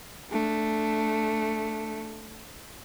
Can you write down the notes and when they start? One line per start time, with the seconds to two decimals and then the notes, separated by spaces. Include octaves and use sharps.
0.30 A3 D4